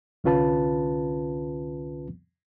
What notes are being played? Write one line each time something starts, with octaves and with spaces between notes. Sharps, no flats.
C2 D3 C#4 F4 B4 A5